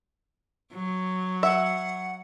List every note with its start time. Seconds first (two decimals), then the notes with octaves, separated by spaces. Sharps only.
0.73 F#3
1.43 E5 F#5